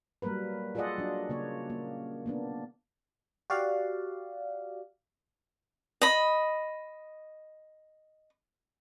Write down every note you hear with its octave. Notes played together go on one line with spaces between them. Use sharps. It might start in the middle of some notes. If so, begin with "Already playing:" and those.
F#3 G3 A#3 A#4 B4
F4 G#4 A4 D5 D#5 F#5
F#3 D4
C#3 A#3 C#5
A#3
A#3 B3 D4
F#4 G4 D5 F5 F#5
D#5 B5